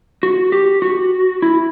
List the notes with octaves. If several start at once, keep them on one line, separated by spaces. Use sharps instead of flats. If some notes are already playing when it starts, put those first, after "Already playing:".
F#4
G4
F#4
E4